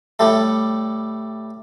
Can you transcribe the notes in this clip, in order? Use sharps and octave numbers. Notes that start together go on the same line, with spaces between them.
A2 G3 A3